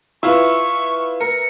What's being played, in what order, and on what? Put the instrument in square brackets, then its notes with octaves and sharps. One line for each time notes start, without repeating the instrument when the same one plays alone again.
[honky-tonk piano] E4 F4 [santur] B4 E5 [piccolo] C#6
[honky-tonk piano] A#4 [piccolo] C#7